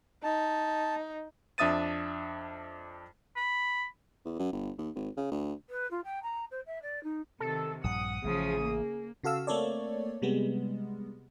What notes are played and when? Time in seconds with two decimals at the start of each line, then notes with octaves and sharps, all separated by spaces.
0.23 D#4 A5
1.58 F2 D4 E5 D#6 A6 D#7
3.36 B5
4.25 E2
4.39 F#2
4.52 G1
4.78 D#2
4.95 G#1
5.17 C#3
5.31 D2
5.70 B4
5.91 F4
6.04 G5
6.23 A#5
6.51 C5
6.66 E5
6.82 D5
7.03 D#4
7.40 C3 D#3 A4
7.84 A#1 G2 F#5 D#6
8.24 A1 C#3 F3 A3 G#4
8.62 A#3
9.24 C#3 F#4 A4 F5 E6
9.47 A3 A#3 C4 A4 C#5 D5
10.22 C3 G3 G#3 B3